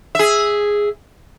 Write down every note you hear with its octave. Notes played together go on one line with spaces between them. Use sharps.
G#4 E5